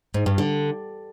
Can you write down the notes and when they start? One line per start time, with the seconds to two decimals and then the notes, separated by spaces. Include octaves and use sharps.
0.14 G#2
0.26 G2
0.38 D3